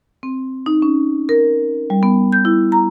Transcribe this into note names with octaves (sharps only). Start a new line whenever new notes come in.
C4
D#4
C#4
A#4
G3
B3
G6
E4
A#5